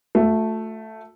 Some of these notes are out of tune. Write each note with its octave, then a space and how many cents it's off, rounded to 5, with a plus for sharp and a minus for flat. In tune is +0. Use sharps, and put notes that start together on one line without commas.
A3 +0 F#4 -45